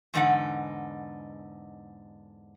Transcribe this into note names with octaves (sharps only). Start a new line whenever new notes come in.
E2 G#2 D3 D#4 F#5